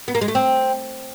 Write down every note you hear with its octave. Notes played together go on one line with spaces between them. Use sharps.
B3
A#3
G#3
A3
C4